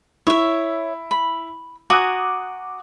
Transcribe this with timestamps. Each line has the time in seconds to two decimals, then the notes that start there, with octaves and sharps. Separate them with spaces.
0.27 E4 C#5 E5
1.11 B5
1.90 F#4 G#5 A#5 D6 D#6 F#6